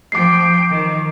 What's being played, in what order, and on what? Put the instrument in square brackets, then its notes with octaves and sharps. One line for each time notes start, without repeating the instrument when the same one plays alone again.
[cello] F3 G5 [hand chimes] D6 C7
[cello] D#3